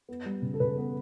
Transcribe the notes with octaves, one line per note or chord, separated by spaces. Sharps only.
B3
G3
C#3
A4
C#3 B4
B3